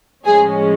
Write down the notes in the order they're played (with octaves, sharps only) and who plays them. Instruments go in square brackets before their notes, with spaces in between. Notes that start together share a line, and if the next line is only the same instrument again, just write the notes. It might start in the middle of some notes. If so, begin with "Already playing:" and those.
[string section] A2 F3 G#3 C#4 G#4